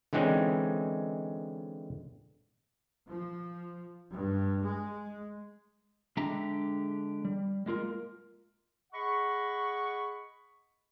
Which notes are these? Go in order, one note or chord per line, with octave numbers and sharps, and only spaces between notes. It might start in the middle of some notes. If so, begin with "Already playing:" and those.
D3 E3 G#3 C4 C#4 D#4
F3
G2
G#3
D3 G#3 D4 G4 E5 A#5
G3
G#3 A#3 F4 A#4
G#4 D#5 F#5 B5 C#6